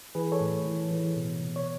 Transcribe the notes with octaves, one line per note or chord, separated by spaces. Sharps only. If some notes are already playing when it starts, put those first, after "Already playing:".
E3 G#4 B4
A4 C#5
A2
E3
E3
B2
B2
C#5